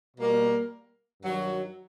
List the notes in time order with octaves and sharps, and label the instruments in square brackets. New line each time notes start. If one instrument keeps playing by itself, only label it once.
[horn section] B2 G3 A#3
G2 D#3 F#3